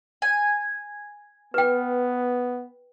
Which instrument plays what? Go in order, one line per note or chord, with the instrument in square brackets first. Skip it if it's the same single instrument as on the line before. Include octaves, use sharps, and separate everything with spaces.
[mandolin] G#5
[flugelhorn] B3 [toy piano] B4 G5